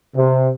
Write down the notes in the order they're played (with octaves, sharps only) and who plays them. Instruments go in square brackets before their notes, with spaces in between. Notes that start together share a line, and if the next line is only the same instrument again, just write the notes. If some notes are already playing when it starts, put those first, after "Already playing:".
[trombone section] C3